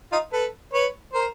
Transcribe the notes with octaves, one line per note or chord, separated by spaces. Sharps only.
D#4 F4
A4 B4
B4 C#5
A#4 C5